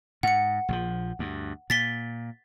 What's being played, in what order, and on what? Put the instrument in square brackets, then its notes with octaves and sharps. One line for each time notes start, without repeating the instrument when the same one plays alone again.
[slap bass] G#2 [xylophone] F#5 C#7
[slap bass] A#1 D3 F3
D2 G2
[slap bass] A#2 [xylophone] A6 B6 G7